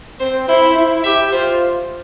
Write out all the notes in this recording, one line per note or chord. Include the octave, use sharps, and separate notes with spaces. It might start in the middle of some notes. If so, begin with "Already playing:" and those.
C4 C5
E4 C5
E4
G4 E5
F4 C5